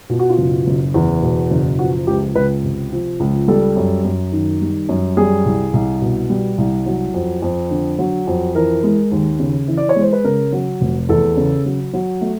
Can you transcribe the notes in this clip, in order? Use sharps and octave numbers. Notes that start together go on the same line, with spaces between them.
B2 F4
F#4
F4
F#1
F#1
E2
B2
F#1
F3 F#4
C#2 G4
C#2 B4
C3
F3
C#2
G3 A4
F#2
F#2
D#3
G3
F#2
G3 G#4
C2
C2
B2
G3
C2
F#3
F2
F2
D3
F#3
F2
E3 A#4
G#3
D#2
C#3
E3
D5
C#5
G#3
C5
B4
C#3 A#4
F#3
F1
E2 A4
C#3
F#3
F#3
A3